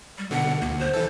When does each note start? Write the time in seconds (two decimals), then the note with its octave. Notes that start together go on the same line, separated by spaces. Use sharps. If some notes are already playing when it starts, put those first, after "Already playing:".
0.18 G3
0.31 B2 D3 F#5
0.62 D2 A#3
0.79 C5
0.94 E3 A4